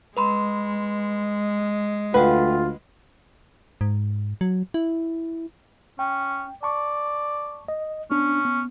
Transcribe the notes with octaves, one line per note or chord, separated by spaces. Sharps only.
G#3 B4 B5 C6
D2 A3 F4 B4 F#5 G5
G#2
F#3
E4
C#4 G5
D5 A5 C#6
D#5
B3 C#4 D4
B3